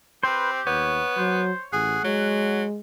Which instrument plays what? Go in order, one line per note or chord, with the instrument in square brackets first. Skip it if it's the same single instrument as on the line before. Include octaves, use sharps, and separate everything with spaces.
[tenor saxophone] C4 [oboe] G4 [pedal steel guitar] B4 C5
[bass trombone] D#2 [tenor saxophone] B3 [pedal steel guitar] C#5
[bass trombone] F#3 [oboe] C5
[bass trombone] A1 [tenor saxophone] G#4 [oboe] F#5
[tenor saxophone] F#3 [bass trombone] G#3